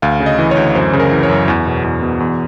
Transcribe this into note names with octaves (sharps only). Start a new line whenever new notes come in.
D2 F5
C#3
D#5
E3
C#5
D2
F#2 C5
C#3
A#4
E3
C#5
F#2
E2
B2
E2
B2
E2